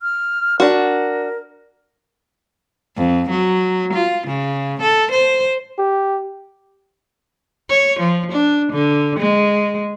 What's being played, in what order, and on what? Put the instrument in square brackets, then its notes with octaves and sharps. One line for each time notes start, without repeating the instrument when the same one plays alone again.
[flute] F6
[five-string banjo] D4 F#4 [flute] A#4
[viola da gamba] F2
F#3
F4
C#3
A4
C5
[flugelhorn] G4
[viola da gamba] C#5
F3
D4
D3
G#3